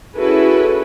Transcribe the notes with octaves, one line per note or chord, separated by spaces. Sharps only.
C#4 E4 F#4 G#4 A4 B4